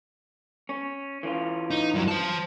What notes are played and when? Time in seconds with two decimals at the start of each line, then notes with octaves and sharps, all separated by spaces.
0.69 C#4
1.23 E3 C#4 F4
1.71 D#4
1.95 G2 F#3
2.08 C5 A5